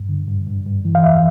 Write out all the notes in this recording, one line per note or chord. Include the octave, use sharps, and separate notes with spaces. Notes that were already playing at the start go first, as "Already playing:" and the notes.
Already playing: G2
D3
G2
G2
G2
E3
F5
F2 E5